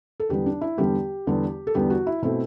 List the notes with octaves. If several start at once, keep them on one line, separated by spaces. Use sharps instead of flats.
A4
E2 D3 G3 B3 G4
D4
E4
E2 D3 G3 B3 G4
E2 D3 G3 B3
A4
E2 D3 G3 B3 G4
F#4
E4
B2 A3 C4 E4